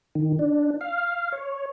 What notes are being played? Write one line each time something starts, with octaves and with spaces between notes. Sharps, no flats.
D#3
D4
F5
C#5